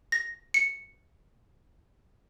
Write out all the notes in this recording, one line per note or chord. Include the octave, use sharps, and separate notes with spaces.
A#6
C#7